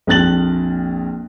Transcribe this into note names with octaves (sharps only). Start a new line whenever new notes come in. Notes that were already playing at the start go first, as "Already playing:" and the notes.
A#1 F2 F#6 A6 F#7